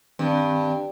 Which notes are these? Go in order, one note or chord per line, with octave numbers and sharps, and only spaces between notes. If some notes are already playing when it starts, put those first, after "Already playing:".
G2 D#3 C4 D4